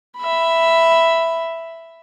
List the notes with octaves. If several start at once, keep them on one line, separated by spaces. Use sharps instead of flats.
E5 B5